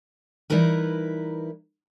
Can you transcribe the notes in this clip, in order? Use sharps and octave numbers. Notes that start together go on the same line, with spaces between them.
E3 G3 D#4 E4 A#4 B4